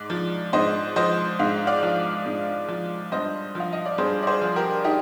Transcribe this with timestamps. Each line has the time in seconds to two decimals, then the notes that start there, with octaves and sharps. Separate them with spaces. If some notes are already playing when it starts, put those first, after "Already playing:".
Already playing: G#2 D5
0.10 F3
0.53 G#2 C5 D#5
0.96 F3 C5 D#5
1.39 G#2 F5
1.67 D5 F5
1.83 F3
2.26 G#2
2.68 F3
3.12 G2 C5 D#5
3.55 F3 F5
3.73 D#5
3.85 D5
3.98 G2 G#4 C5
4.23 D5
4.27 G#4 C5
4.41 F3
4.56 G4 A#4
4.84 D#4 G4